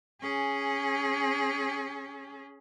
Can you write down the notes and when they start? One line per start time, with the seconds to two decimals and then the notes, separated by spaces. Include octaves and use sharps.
0.21 C#4 G#4